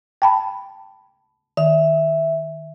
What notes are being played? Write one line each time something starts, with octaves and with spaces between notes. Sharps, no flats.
G5 A5 B5
D#3 E5